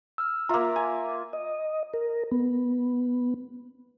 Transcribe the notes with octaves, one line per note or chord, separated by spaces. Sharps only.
E6 F6
A#3 F4 E5 A#5
G#5
D#5
A#4
B3